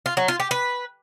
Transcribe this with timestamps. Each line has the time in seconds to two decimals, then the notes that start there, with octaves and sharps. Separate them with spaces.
0.06 F4
0.17 F#3
0.28 F4
0.40 G4
0.51 B4